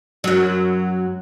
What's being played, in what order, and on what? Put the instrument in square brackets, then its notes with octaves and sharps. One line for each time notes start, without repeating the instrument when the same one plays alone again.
[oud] F#2 F#3